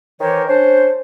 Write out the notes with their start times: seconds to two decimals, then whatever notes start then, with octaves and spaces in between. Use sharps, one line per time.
0.20 D#3 E3 A#4 C5 C#5
0.48 C#4 D4 C5